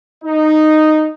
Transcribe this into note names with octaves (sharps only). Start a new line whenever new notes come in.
D#4